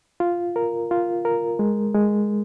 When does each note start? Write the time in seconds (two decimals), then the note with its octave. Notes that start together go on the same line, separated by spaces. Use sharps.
0.20 F4
0.56 A#4
0.91 F4
1.25 A#4
1.59 G#3
1.94 G#3